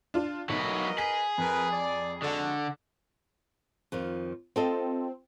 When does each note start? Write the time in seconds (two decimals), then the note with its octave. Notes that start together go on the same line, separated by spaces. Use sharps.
0.14 D4 F4
0.49 B1 F#3 E4 A#4 B4 D#5
0.98 G#4 B6
1.38 F2 A#4 B4
1.71 D5
2.22 D3 G#3 F#4 A4
3.92 F2 D#3 F4
4.56 C4 F4 A4 D#5